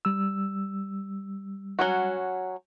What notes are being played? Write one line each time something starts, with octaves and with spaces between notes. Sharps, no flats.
G3 E6
F#3 C#4 F#4